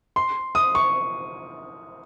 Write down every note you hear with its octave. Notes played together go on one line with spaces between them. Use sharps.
C6
D#6
C#6